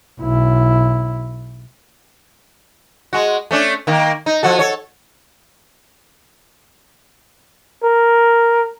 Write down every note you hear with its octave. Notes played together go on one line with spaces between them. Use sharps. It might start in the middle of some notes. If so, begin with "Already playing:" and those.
B1 E4
G#3 F#4
A3 C#4 D4
D#3 A#3
D#4
F3 F#4 A4
A4 C#5
A#4